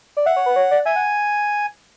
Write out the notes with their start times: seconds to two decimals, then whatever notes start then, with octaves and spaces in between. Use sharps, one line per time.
0.17 D5
0.26 E5 F#5
0.37 C#5
0.46 B4
0.56 C#5
0.71 D5
0.86 E5 G#5
0.96 F#5